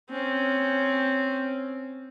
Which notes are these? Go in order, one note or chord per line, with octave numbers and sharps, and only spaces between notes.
C4 C#4